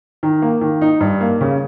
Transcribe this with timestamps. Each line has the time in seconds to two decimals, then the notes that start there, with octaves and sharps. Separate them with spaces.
0.23 D#3
0.42 A#3
0.61 D#3
0.82 D#4
1.00 G2
1.20 A#3
1.41 C#3